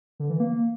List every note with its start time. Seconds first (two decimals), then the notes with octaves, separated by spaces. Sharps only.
0.20 D3
0.30 E3
0.40 A#3